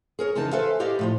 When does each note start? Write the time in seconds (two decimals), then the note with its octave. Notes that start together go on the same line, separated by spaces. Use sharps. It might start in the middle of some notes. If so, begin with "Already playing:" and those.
0.19 G#4 A#4 C#5
0.35 F2 C#3 E3 D#4 A5
0.52 A4 B4 C5 E5 F5 G#5
0.80 E4 G4 D5 D#5 F5
0.99 A2 F3 F4